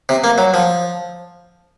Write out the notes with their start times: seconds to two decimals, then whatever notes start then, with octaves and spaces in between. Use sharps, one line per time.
0.09 C3
0.24 A#3
0.38 F#3
0.54 F3